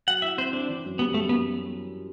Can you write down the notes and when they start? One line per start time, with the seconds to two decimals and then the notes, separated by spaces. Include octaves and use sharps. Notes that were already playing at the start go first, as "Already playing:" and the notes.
0.08 F#3 F#5
0.22 E4 E5
0.37 C4 C5
0.53 C4 D4
0.69 E3
0.85 F#2
0.99 G3 B3
1.14 F#2 A3
1.29 B3